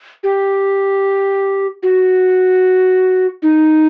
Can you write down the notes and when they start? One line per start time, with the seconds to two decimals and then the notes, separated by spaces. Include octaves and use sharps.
0.23 G4
1.83 F#4
3.42 D#4